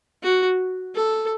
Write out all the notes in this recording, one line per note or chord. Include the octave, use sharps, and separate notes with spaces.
F#4
A4